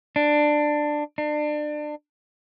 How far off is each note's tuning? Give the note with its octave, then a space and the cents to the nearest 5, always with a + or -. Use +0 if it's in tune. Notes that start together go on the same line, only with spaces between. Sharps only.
D4 +15
D4 +30